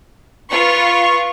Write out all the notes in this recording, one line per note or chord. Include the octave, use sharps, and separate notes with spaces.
F4 B4 C#6